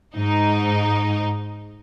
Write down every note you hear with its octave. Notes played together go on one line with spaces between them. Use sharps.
G#2 D#4